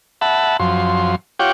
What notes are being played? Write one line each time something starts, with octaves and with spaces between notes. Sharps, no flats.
E5 F#5 A5 B5
F#2 F3 C6
F4 G4 C#5 F#5 G5 D6